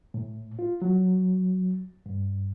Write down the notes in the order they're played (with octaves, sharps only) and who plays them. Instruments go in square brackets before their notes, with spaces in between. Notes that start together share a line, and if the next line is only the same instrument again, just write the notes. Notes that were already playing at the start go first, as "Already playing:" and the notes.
[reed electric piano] A2
F4
F#3
G2